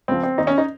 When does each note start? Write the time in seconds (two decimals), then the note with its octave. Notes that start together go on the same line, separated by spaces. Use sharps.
0.08 C#2 C#3 F3 C4
0.23 C4
0.38 D#2 D#3 D#4
0.47 C#4
0.58 D#4